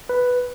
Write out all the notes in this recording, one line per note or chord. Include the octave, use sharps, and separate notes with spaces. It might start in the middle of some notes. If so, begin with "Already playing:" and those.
B4